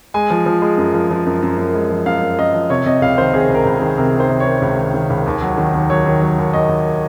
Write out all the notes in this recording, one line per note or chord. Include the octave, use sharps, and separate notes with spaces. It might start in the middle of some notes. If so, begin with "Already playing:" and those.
G#3 G#5
F3
F3
G#3
F#2
F3
F3
F#2
F#2
F#2
G#3
F3
F#2 F5
F#2
F#2 D#5
F3
C3 C#5
C3 D#5
C#2 F5
D#3 C5
C3 G#4
C#2
A#4
C#2
D#3 G#4
C3 A#4
D#3
C5
C3
C#5
D#3
C#2
D#3
D#3
C#2
D#2
F#3
D#3
D#2
F#3 C#5
D#3
F#3
D#2
D#2 D#5
D#2